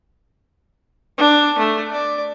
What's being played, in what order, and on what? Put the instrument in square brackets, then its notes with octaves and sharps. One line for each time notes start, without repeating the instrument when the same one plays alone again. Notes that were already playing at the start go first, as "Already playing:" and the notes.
[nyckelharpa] D4
A3
D5